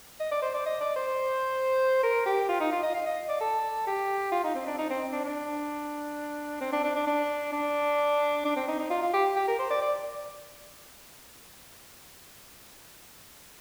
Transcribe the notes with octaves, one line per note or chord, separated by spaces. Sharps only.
D#5
D5
C5
D5
D#5
D5
C5
A#4
G4
F4
D#4
F4
D#5
F5
D#5
D5
A4
G4
F4
D#4
C4
D4
D#4
C4
D4
D4
C4
D4
D4
D4
D4
D4
D4
C4
D#4
D#4
F4
F4
G4
G4
A#4
C5
D5
D5